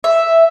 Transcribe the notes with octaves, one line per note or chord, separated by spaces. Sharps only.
E5